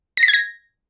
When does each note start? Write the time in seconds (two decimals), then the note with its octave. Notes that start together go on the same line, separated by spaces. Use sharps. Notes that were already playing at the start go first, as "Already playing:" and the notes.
0.17 A#6
0.23 B6
0.28 G#6
0.34 A#6